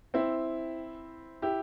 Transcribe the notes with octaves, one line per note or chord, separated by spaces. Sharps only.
C4 E4
E4 G4